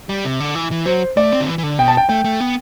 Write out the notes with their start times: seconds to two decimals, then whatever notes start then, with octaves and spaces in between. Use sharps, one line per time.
0.09 G3
0.25 C3
0.40 D3
0.55 E3
0.71 E3
0.86 F#3 C5
1.17 A3 D5
1.32 C4
1.40 D3
1.47 E3
1.58 E3
1.63 D3
1.79 B2 G5
1.88 A5
1.97 G5
2.09 A3 G5
2.24 A3
2.40 B3